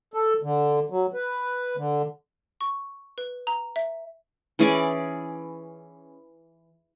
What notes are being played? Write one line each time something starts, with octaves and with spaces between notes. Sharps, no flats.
A4
D3
F#3
B4
D3
C#6
B4
A#5
E5
E3 C#4 G#4 D5